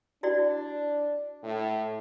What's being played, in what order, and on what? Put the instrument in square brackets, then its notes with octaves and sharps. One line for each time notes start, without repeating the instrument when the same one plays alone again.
[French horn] D4 [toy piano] E4 F#4 D5
[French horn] A2